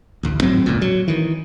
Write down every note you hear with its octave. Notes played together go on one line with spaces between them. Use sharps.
A1 D2
G#1 A2 F#3 C4
E1 C#2 A#2
F#3
D#3 E3